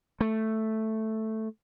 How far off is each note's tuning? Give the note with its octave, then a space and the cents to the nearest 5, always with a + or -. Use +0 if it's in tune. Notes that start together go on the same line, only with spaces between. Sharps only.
A3 +0